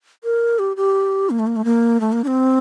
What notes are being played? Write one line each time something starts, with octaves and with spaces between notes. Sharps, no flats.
A#4
G4
G4
A#3
A3
A#3
A3
A#3
A3
A#3
D4
C4